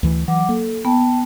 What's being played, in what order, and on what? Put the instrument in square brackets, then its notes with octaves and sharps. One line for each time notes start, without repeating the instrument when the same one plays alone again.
[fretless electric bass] D2 E3
[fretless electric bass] E3 [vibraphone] F#3 F#5 D6
[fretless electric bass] A#3 [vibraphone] A4
[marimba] B3 [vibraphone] G5 A5